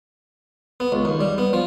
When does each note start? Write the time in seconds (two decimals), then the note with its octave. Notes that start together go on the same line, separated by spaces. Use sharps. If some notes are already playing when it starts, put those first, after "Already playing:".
0.80 B3
0.92 C#2
1.05 D#2
1.21 G3
1.38 B3
1.53 F3